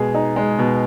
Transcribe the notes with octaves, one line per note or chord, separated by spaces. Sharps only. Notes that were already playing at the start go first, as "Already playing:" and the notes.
Already playing: B2 G#3 G#4
D#4
G#3
B2